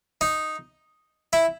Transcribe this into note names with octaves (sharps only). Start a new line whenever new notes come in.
D#4
E4